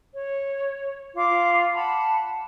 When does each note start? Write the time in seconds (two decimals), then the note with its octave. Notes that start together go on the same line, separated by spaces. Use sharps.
0.13 C#5
1.16 F4 D6
1.73 F#5 A5 B5